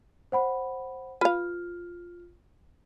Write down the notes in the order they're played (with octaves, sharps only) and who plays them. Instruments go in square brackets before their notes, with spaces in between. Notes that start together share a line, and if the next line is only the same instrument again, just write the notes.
[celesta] C5 F#5 B5
[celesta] F4 F6 [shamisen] B4 F5